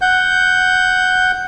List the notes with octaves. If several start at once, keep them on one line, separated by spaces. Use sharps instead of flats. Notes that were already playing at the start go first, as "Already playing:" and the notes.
F#5 G6